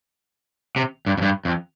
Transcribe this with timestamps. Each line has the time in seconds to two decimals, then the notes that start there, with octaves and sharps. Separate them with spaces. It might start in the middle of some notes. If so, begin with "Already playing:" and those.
0.76 C3
1.06 G2
1.18 F2
1.22 G2
1.45 F2